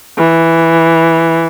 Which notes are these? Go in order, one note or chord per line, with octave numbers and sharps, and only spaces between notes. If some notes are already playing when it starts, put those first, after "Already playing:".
E3